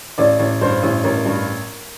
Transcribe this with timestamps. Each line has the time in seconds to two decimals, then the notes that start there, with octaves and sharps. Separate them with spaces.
0.18 A1 D5
0.39 A1
0.61 G2 C5
0.83 A1
1.04 A1 A#4
1.26 G2